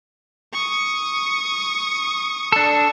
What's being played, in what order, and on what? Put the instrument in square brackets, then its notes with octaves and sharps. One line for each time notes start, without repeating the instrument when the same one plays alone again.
[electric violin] C#6 D#6
[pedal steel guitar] D4 A4